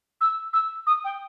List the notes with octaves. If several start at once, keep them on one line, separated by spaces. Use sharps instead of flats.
E6
E6
D#6
G5